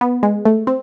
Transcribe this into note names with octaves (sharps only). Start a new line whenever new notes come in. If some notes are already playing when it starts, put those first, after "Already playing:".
B3
G#3
A3
C4